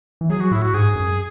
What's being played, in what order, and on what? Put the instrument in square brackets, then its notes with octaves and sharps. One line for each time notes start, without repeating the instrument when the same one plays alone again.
[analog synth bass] E3
[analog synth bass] F#3 [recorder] G#4
[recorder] F#4
[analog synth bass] A2 [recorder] E4
[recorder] F#4
[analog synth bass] G#2 [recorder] G#4
[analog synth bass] F#2